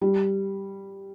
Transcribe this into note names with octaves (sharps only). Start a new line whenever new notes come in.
G3